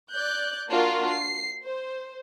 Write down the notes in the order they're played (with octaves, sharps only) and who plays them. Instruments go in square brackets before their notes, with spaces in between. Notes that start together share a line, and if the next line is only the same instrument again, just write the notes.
[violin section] D5 F#6 G6
A#3 D4 F4 F#4 A#4
C7
C5